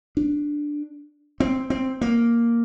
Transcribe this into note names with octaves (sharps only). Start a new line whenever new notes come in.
D4
C4
C4
A#3